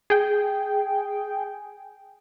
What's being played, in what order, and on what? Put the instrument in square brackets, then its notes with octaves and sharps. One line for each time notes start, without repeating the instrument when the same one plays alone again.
[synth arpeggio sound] G#4 G5